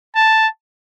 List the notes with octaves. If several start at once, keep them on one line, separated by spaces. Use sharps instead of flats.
A5